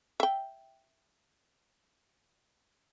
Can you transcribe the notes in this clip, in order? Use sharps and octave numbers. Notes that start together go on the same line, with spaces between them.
E5 G5